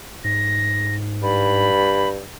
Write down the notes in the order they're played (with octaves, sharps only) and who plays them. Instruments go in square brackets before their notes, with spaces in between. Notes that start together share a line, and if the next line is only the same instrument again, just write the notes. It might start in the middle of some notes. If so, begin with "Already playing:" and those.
[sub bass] G#2 [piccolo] A#6
[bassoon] G2 [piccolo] B5